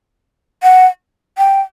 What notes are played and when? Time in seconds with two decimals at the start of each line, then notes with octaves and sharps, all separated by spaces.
0.63 F#5
1.38 G5